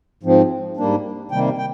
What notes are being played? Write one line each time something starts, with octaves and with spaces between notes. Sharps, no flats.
G#2 F3 C4
G#2 G3 A#3 D4
C3 D#3 G3 A#3 G5
G5